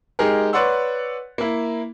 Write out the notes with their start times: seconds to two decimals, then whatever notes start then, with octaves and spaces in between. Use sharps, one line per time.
0.19 G#3 D#4 G4 G#4 A#4
0.53 B4 C#5 D5 F#5 C6 E6
1.38 A#3 E4